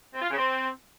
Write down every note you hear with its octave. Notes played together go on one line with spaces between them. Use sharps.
C4
F4
C#3
C4